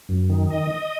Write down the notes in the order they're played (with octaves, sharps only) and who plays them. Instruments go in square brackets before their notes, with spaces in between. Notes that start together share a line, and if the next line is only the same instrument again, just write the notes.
[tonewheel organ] F#2
D#3
D#5